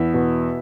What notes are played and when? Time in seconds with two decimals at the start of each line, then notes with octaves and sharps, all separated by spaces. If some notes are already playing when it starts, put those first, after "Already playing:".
Already playing: E2 E4 E5
0.14 B2